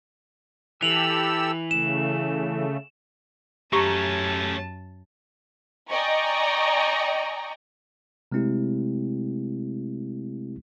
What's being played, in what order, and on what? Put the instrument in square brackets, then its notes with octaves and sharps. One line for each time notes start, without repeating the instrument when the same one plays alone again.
[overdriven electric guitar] E3 [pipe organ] G4 A4 E6 [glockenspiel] F7 F#7
[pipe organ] C#3 A3 [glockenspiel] E7
[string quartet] F#2 A5 [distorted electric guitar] A3 C#4 [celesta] G4 [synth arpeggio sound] A#5 C#6
[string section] D5 D#5 G5 G#5 A#5 C#6
[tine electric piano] C3 G#3 A3 C4 E4 G4